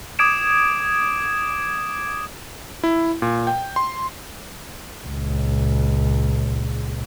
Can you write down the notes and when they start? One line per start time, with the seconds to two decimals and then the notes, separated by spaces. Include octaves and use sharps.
0.19 D6 D#6 G#6 D7 E7
2.84 E4
3.22 A#2
3.47 G5
3.76 C6
5.07 C#2 A#2